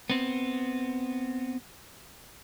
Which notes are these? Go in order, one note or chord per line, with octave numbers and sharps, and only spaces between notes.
B3 C4